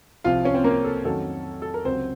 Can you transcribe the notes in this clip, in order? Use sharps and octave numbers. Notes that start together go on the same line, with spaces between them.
C2 C3 F3 C4 F4 F5
C#4 C#5
C4 C5
A#3 A#4
A4
F2 D#3 F#3 A3 C#4 A4
A4
A#4
C#2 C3 F#3 C4 C5